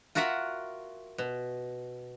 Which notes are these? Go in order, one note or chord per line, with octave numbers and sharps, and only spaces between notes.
F4 F#4 A#4 E5 F#5
B2